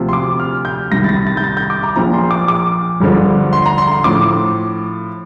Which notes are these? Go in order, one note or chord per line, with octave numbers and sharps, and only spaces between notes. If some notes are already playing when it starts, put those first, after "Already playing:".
Already playing: D2 C3 F3
C6
D6
F6
G6
C2 C3 D#3 A#6
A6
A#6
A6
G6
A6
G6
D6
A#5
A#1 A#2 F3 A#5
C6
D6
D6
G1 G2 D3 F3
C6
A#5
C6
C6
A2 F3 D6